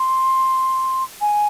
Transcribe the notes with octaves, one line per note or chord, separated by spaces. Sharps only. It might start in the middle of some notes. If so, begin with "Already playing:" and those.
Already playing: C6
G#5